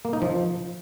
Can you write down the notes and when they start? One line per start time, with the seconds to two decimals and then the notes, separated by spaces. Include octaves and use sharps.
0.05 A#3
0.13 D#4
0.22 F3